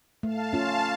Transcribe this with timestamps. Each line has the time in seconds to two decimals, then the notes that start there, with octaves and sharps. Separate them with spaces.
0.23 A3 F5 A5
0.53 C#4 F4